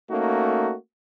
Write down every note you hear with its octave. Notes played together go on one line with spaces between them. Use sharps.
A3 A#3 C#4 D#4 F#4